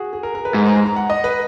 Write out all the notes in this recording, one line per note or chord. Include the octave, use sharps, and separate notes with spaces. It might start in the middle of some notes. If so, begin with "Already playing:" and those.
Already playing: F#4 G#4
G#4
A#4
A#4
B4
G#2
A#5
A#5
A#5
F#5
D#5
B4